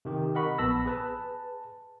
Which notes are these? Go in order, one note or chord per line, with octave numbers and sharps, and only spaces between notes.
C3 D#3 G4
A#4 D#5 F#5 B5 C#6
A#1 B3 A5 B5 E6 A#6
G#4 B4 A5